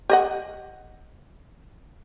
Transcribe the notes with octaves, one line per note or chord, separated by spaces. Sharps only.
G4 D#5 F#5